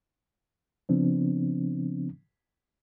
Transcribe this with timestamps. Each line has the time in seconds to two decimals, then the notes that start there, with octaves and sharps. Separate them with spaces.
0.89 C#3 F3 B3 C4 D4